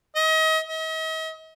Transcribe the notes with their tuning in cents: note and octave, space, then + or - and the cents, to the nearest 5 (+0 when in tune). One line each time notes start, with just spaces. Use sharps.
D#5 +35
D#5 +45